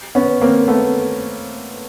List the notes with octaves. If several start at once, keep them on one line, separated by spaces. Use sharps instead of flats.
B3 C#4
A#3 C4
A3 B3